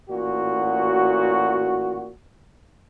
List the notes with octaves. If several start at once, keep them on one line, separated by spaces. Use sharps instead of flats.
A1 A#2 F#4